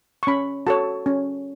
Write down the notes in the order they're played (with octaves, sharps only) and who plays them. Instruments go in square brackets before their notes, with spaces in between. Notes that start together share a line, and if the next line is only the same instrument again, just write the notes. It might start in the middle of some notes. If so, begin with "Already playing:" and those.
[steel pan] C#6
C#4 B5
F#4 A4 C#5 A5
C#4